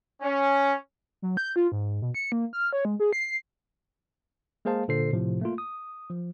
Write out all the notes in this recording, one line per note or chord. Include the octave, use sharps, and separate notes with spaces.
C#4
F#3
G6
F4
G#2
B2
C#7
A#3
F6
C#5
G#3
G#4
C7
G#3 A#3 G#4 C5 F5 A5
A#2 D3 A4 C5 C7
A2 C3 F3
A3 A#3 F4
D#6
F3